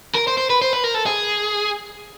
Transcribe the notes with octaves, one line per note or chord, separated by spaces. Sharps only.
A#4
C5
C5
B4
C5
B4
A#4
A4
G#4